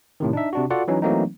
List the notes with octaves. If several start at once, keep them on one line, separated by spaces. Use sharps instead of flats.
A2 C3 D#3
D4 D#4 E5
C3 D4 F#4
F4 F#4 A4 D5 F#5
E3 F#3 C#4 D#4
E3 F#3 A3 A#3 C4 D#4